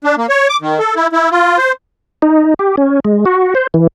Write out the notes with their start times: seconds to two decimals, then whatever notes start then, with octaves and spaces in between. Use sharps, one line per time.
0.04 D4
0.18 A#3
0.29 C#5
0.49 D6
0.61 D#3
0.79 A4
0.96 E4
1.12 E4
1.31 F4
1.58 C5
2.22 D#4
2.59 G4
2.77 C#4
3.05 G#3
3.25 F#4
3.55 C5
3.74 E3